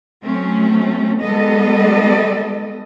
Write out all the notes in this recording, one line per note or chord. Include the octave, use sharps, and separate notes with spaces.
F#3 A3 C4 C#4
D#3 G3 G#3 B3 A4 D#5